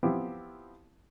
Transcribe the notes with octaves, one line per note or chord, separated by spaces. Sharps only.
F3 B3 C4 E4 G4